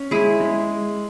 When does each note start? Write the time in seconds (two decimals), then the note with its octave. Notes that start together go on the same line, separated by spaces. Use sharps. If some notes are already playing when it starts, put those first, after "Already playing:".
Already playing: C#4
0.11 G#3 E4 G#4
0.40 G#3